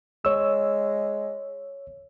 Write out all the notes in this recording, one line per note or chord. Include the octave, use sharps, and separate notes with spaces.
G#3 C#5 E6